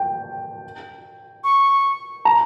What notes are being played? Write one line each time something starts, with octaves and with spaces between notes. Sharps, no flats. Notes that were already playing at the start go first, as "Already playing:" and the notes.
Already playing: G5
C#6
A#5